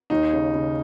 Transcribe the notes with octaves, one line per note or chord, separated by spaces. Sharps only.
D#2 D#4
C#3
C#3